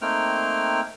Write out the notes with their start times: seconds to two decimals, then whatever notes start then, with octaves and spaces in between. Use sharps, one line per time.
0.02 A3 A#3 C4 D#4 G5 F6